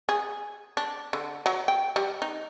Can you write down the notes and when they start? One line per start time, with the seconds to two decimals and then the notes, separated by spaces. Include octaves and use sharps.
0.09 G#4
0.77 D4
1.13 D3
1.46 F#3
1.68 G5
1.96 G3
2.22 D#4